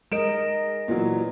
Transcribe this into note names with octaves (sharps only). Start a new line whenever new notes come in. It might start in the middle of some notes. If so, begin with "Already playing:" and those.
G#3 A#4 D#5 D7 E7
A#2 E3 F#3